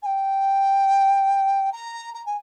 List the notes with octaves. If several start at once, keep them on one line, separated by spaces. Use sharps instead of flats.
G#5
G5
A#5
A#5
G#5